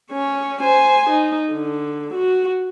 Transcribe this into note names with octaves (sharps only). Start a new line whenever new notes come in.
C#4 C#5
C5 G#5
D#4
D3
F#4